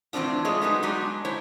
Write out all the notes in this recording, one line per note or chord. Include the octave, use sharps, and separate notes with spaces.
A2 E3 G3 C4 D4 F4
G#3 A3 F4 G#4 C#5 D#5
F#3 G#3 B3 D#4
F#3 G#3 D4 D#4 G4
E4 C5 C#5